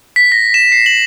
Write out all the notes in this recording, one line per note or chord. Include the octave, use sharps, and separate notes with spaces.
B6
A#6
E7
C7
F#7